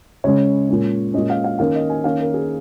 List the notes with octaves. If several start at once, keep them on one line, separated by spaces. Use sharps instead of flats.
C#3 G#3 C#4 C#5
A#2 G#3 C#4
A#2 G#3 C#4 D#5
F5
F5
D#3 A#3 C#4 F5
D#5
G#5
D#3 A#3 C#4 F5
A#4
G#4